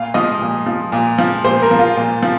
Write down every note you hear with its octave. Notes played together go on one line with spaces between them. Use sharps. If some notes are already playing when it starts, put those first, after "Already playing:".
Already playing: A#2 F5
F3 D#5
A#2
F3
A#2
F3
A#2 C5
A#4
F3
F4
A#2
F3